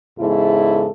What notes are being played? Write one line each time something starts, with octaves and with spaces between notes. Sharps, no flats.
E2 G#2 C#3 E4 A4